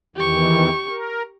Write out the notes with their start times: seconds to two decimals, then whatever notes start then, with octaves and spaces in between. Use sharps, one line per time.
0.16 E2 D#3 E3 G4 C#6
0.89 A#4